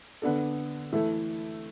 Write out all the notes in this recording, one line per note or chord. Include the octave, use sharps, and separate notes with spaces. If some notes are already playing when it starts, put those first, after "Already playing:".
D3 B3 D4 A4
E3 A3 E4 A4